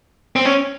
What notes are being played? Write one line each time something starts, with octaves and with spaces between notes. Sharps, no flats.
C4
C#4